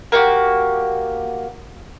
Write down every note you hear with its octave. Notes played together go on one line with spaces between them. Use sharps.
A#3 F#4 G4